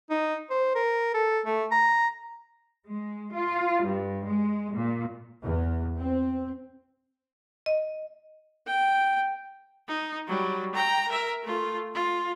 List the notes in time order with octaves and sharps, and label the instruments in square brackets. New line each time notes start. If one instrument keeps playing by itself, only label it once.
[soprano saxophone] D#4
C5
A#4
A4
A3
A#5
[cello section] G#3
F4
G2
G#3
A#2
[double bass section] E2
C4
[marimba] D#5
[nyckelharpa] G5
[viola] D#4
F#3 G3
G5 A#5
A#4 E5
A3 F4
F4